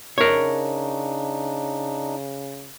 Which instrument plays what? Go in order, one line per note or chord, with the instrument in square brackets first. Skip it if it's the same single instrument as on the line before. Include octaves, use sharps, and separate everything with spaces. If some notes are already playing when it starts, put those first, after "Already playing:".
[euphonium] C#3 [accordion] D4 D#4 [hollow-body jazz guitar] A#4 C#5